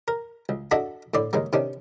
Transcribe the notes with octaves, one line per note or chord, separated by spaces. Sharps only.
A#4
C#2
D4 F#4 A4 D#5 E5
A2 D3 D5 C6
D#2 C#3 G#3 A#3
C3 D#3 C#4 D4